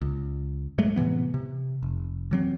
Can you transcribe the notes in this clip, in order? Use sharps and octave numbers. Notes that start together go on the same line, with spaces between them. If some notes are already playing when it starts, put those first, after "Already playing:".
C#2
G#2 F#3 G#3 A3
A2 C3 E3 B3
C3
F1
E3 F#3 C4